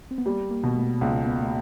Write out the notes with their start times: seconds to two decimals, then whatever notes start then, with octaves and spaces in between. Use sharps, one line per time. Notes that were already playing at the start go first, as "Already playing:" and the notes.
0.11 C4
0.18 B3
0.26 G3 A#3
0.51 A#3
0.63 B2
0.76 A3
1.01 C#2 A#3
1.26 B3
1.41 A3